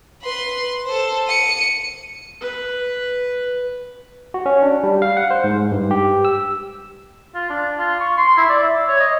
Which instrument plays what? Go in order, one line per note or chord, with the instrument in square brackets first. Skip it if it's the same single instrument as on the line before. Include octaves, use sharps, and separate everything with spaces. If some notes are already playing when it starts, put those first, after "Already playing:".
[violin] B4 C6
A4 C5
C#7 D#7
[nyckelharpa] B4
[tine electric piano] F#4
C#4
D4
G3
F5
F#5
C5
G#2
G2
G4
E6
[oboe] F4
D4
F4
C#6
C6
E4
D5
E5
C#5
D#5